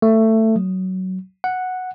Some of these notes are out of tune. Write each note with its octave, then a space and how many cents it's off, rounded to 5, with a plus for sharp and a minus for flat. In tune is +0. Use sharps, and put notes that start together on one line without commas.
A3 +15
F#3 +15
F#5 -5